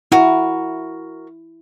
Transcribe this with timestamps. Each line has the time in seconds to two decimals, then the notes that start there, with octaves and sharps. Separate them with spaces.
0.12 E4 F#4 A#4